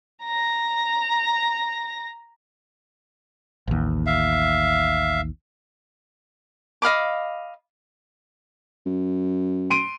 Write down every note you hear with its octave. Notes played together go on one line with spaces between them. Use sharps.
A#5 A#6
A1 D#2
E5 F5
D#5 F5 B5 D6
F#2
C6 D7 D#7